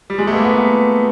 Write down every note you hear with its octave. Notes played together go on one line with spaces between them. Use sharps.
G3
G#3
A3
B3
A#3
B3